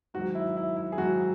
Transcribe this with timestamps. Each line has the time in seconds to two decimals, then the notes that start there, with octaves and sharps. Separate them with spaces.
0.14 G#2 D#3 F#3 F#4
0.35 E4
0.57 E4
0.76 E4
0.92 G#4
0.98 G#2 D#3 F#3 F#4